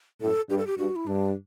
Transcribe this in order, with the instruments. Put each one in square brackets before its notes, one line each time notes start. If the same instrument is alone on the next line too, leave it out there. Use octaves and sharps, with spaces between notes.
[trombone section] F#2 A2 [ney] A4
[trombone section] G2 [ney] G4
[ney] A4
G4
[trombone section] G2 [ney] F#4
[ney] E4
[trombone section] G2 [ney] D4